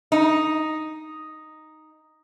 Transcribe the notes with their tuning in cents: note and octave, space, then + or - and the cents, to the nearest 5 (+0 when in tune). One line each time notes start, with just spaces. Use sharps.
D#4 +0